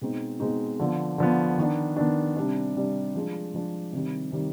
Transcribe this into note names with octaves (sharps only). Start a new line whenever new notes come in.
B2 G#3 C4 D#4
B2 G#3 C4 D#4
D3 F3 B3
D3 F3 B3
D#3 B3 D4
D#3 B3 D4
C3 G3 D4
C3 G3 D4
F3 G#3 D4
F3 G#3 D4
C3 D#3 G3
C3 D#3 G3